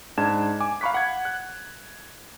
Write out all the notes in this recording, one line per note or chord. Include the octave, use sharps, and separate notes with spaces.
G#2 D4 A5 G#6 E7
G#5 D6
F5 A#5 B5 C#6 F#6 B6
F#5 G#6
F#6